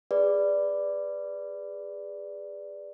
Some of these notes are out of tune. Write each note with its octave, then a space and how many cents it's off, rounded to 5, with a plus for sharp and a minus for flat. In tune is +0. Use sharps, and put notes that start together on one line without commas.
G#4 -25 B4 +5 D5 +0